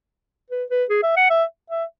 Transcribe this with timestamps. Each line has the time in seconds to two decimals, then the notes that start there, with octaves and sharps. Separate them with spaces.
0.50 B4
0.70 B4
0.90 G#4
1.03 E5
1.17 F#5
1.30 E5
1.70 E5